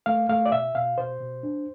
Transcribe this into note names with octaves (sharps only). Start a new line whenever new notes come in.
A3 F5
A3 F5
D5
B2 E5
B2 F5
B2 C5
B2
D4